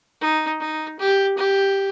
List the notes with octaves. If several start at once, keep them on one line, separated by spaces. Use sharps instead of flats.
D#4
D#4
G4
G4